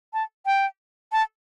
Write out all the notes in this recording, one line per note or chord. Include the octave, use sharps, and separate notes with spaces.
A5
G5
A5